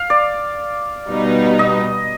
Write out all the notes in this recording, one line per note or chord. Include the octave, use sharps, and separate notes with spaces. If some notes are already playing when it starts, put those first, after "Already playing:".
Already playing: F5
D5
B2 G3 B3 D#4
D#5